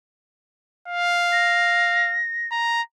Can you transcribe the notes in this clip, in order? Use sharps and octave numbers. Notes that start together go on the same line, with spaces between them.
F5
A#6
A#5